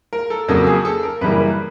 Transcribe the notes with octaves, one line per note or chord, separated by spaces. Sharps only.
A#4
A4
F2 C#3 F#3 A#3 A4
G#4
A4
A#4
F#2 C#3 E3 G3 A#3 B4
A#4
B4